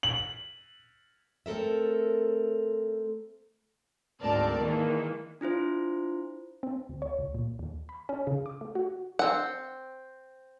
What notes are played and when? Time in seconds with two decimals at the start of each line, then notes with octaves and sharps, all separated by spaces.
0.03 F#7
1.46 A3 C4 A4 A#4 E5
4.21 D2 G#2 C4 A#4 D5 A5
4.58 D#3 E3 G#3 A#3
5.41 D4 E4 F4 C5
6.63 C4
6.89 D2
7.02 C#5
7.19 C#2
7.34 A#2
7.59 D#2
7.89 B5
8.09 C#4
8.27 C#3
8.46 D6
8.61 A3
8.75 F#4
9.19 C4 F#5